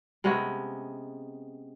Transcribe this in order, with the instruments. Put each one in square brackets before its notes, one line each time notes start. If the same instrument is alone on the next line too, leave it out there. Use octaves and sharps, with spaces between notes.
[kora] C3 G#3 B3 C#4